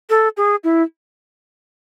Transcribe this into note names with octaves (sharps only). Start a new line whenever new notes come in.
A4
G#4
E4